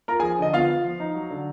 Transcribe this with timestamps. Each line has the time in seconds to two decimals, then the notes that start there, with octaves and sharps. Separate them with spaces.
0.08 F4 A#4 A#5
0.20 F3 G#4 G#5
0.39 D3 D#5
0.53 B3 F4 F5
0.69 F4
0.84 F3
1.00 D#4
1.15 F#3
1.30 D3